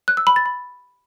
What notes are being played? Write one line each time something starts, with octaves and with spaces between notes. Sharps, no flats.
F#6
E6
B5
A6
B5